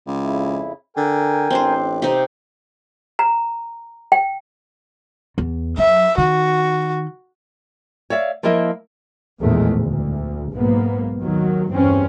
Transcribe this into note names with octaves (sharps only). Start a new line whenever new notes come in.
C#2
F2 C#3 E4
D3 A#4 G5 G#5
A1 C4 D4 C5
C3 D#4
A#5
G5
E2
F#3 E5
D#3 F#4
C#5 D5 E5 F5
F3 A#3 E4 A#4 D#5 E5
A#1 E2 A2 D#3 G#3 A3
D2
B1 G#2 A#3 B3
D#2 D#3 F#3
E2 G2 C4 C#4